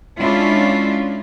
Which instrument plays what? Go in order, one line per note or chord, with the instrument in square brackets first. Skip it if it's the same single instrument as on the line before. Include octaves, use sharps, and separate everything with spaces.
[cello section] G#3 C#4 D4 E4 F4